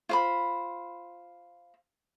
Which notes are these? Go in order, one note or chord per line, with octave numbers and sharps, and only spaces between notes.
F4 C5 B5